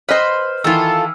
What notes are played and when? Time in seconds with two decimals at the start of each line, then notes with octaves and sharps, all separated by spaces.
0.09 B4 C5 D#5 F#5 F6
0.64 D#3 E3 E4 F4 A4 E6